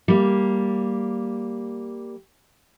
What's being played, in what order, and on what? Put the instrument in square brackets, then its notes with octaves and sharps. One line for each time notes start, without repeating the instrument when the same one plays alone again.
[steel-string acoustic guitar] G3 A#3